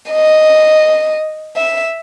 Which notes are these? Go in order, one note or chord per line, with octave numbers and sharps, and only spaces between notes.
D#5
E5